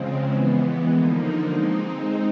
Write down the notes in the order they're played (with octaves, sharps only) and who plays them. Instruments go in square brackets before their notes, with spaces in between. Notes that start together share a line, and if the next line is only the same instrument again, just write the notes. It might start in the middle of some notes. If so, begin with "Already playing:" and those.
Already playing: [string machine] C#3 F3 G#3 C4
E3 G#3 B3
D3 F3 A#3 D#4
G#3 C4 D#4